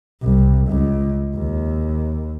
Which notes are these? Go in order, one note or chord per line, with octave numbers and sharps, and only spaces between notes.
C2
C#2
D#2